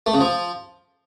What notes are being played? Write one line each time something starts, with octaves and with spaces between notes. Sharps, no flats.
A3
C#3
F3